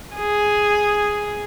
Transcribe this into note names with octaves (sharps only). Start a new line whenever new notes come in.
G#4